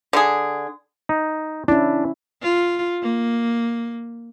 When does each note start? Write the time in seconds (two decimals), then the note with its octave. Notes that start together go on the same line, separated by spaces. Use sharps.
0.13 D3 G#4
1.09 D#4
1.68 C#4 D4 E4
2.42 F4
3.02 A#3